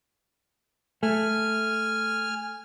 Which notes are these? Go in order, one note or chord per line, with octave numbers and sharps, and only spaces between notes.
A3 G#5 F6